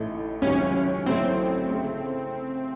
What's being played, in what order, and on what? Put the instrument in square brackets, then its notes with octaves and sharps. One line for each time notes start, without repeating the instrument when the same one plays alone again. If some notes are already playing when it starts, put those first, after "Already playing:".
Already playing: [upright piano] A1 A2 A3 D#4 A4
[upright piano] C#2 C3 D#3 F#3 [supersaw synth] C#4
[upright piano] A1 A2 F#3 A3 C#4 [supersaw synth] C4
[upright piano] C#3 A3